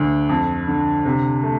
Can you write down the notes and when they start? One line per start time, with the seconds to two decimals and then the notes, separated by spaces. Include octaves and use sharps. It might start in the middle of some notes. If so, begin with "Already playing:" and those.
Already playing: D2 D3
0.29 F2
0.68 D3
1.05 C3
1.43 A3